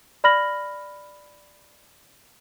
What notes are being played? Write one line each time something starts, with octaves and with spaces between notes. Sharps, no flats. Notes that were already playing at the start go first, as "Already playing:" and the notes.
D5 B5 F6 A#6 F#7